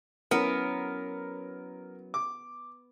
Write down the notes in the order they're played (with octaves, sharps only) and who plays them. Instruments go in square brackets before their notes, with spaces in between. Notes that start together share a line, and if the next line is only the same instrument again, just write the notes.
[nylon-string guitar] F#3 C#4 E4 [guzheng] B3 [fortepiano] A#4
[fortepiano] D6